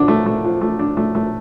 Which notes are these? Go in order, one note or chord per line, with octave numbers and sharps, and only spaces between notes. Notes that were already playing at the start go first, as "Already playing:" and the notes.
Already playing: D3 D4
A3
A3
F3
A3
D4
A3
A3